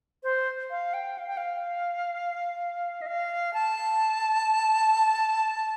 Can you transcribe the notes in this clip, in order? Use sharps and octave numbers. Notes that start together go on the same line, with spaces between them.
C5
F5
G5
F5
G5
F5
D#5
F5
A5